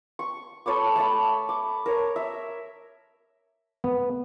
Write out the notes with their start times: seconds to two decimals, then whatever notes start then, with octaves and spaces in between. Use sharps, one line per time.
0.19 C#6
0.66 A4 C#5 B5 D6
0.96 A3 A5 B5
1.49 D6
1.86 A#4 C#5
2.16 E5
3.84 B3